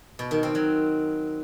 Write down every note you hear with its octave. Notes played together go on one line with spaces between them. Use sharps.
B2
D#3
C4
F#3